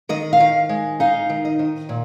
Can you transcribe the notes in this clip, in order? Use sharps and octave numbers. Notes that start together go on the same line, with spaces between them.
D#3 D#5
F5
D#3
G#3
D#4 F5
D#3
D#5
D#3
A#2